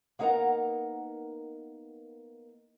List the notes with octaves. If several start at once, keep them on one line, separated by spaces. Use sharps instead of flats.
A#3 B3 D#4 A#4 F#5 A#5